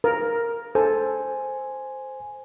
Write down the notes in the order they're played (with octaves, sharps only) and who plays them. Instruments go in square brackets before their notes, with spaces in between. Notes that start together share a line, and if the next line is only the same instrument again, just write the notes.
[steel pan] A#4
[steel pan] A4 [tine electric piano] C5 G#5